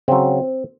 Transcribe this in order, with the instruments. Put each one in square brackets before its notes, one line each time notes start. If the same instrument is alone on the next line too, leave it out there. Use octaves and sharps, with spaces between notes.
[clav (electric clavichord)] C#3 F#3 C4